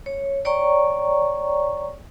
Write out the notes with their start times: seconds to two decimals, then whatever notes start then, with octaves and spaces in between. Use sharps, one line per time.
0.06 C#5
0.45 C#5 D5 G5 A#5 C#6